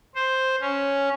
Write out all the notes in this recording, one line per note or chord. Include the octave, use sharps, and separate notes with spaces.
C5
C#4